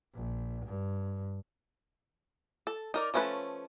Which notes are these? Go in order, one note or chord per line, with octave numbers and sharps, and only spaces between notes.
A#1
G2
A4
D#4 A#4 D5
F3 A3 C#4 A4 B4